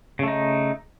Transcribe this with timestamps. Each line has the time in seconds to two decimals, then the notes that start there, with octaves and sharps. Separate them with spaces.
0.19 C#3
0.23 A3
0.28 D#4